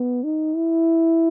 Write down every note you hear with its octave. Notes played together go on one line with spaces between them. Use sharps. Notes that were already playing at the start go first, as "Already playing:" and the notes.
Already playing: B3
D#4
E4